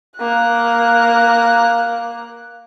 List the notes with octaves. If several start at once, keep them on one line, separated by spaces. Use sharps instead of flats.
A#3 F#6